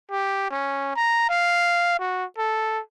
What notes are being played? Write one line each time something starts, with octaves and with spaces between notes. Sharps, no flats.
G4
C#4
A#5
F5
F#4
A4